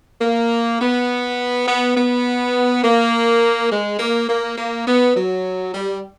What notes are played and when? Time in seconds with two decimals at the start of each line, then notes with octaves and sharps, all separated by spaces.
0.21 A#3
0.80 B3
1.67 B3
1.96 B3
2.84 A#3
3.71 G#3
3.99 A#3
4.29 A#3
4.57 A#3
4.87 B3
5.15 F#3
5.74 G3